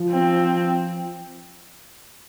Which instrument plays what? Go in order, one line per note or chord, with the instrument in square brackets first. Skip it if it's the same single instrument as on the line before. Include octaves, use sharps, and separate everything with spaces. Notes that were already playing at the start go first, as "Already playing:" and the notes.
Already playing: [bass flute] F3
[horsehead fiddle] C4